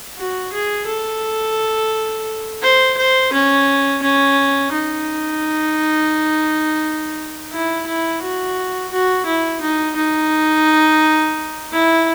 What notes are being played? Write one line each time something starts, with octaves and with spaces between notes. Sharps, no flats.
F#4
G#4
A4
C5
C5
C#4
C#4
D#4
E4
E4
F#4
F#4
E4
D#4
D#4
E4